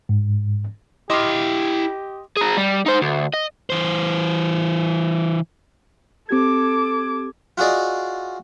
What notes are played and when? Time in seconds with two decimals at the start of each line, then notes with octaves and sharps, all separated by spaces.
0.09 G#2
1.10 E4 G4 D#5 F5 C6 D6
2.37 G#4 A#4
2.57 G3
2.86 D#4 C5
3.01 D2
3.34 D#5
3.70 E3 C5
6.29 C4 G4 A4 D6 G#6
7.58 F4 F#4 G#4 D5 D#5